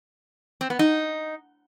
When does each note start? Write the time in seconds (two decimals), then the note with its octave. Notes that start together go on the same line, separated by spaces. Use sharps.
0.61 C4
0.70 B3
0.79 D#4